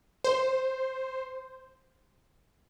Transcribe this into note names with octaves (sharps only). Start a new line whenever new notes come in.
C5